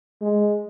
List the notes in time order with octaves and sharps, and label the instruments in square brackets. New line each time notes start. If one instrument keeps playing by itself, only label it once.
[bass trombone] G#3